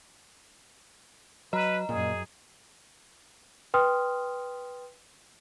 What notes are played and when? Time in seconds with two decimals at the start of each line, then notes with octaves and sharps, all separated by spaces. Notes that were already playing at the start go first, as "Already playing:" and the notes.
1.53 F#3 B4 D#5 A#5
1.89 F#2 A#2 G#4
3.74 B4 G5 C6 D#6 F6